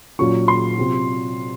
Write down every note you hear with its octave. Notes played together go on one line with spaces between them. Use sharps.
A#2 F#3 C#4 F4 C#6
C6
C3 F#3 C4 F4